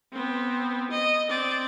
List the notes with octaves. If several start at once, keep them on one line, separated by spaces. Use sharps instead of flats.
B3 C4
D#5
C4 D5